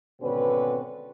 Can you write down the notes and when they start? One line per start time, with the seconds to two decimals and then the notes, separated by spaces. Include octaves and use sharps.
0.21 G#1 B2 D3 C4 C#4 B4